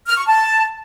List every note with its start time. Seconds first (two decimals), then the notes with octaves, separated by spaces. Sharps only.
0.08 F6
0.17 C#6
0.26 A5